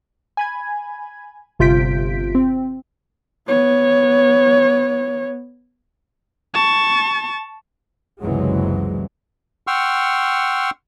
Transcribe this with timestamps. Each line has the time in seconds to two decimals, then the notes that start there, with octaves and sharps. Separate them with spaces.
0.37 G#5 B5 G#6
1.59 G1 C3 F4 G6 B6 D7
2.35 C4
3.48 B3 C#5
6.54 A5 C#6
8.23 F#1 C#2 C3 E3 F#3 G#3
9.67 F#5 G5 C6 C#6 E6 F6